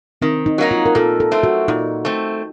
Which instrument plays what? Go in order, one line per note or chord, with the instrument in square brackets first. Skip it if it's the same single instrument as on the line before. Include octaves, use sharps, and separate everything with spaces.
[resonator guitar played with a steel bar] D#3 [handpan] C4
[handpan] D#4
[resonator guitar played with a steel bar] F#3 A#3 D#4
[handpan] F4
A#4
[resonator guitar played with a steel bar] A#2 [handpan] A4
[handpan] A4
[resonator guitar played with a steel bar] A3 C4
[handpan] F#4
[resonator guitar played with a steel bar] A#2 [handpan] D#4
[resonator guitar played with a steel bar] A3 C4